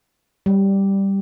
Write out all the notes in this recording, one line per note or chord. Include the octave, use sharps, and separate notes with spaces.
G3